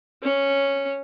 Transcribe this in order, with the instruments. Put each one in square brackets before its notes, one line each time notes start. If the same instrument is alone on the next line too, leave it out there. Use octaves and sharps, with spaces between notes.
[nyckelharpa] C#4